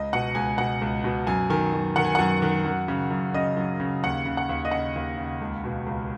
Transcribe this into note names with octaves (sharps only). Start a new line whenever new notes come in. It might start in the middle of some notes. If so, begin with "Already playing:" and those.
Already playing: C#2 D#5
B2 F#5
C#2 G#5
B2 F#5
C#2
B2
F#2 G#5
D#3 G#5
F#2
D#3 F#5
G#5
F#2 F#5
D#3
F#2
C#3
F#2
C#3 D#5
F#2
C#3
D#2 F#5
C#3
F#5
D#2
D#5
C#3 F#5
D#2
C#3
C#2
B2
C#2